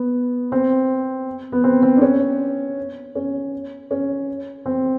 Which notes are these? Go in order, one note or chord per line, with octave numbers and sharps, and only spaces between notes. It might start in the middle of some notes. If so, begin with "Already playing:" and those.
Already playing: B3
C4
B3
C4
C4
D4
C#4
C#4
C#4
C4